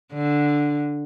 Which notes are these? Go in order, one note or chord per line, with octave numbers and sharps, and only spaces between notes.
D3